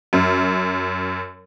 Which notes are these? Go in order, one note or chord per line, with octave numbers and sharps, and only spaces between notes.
F#2